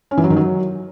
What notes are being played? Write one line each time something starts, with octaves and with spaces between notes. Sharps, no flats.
C#4
E3
F#3
D#3
F#3